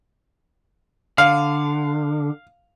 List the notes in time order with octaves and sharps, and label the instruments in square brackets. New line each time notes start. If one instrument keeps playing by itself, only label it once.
[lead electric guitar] D3 [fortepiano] F5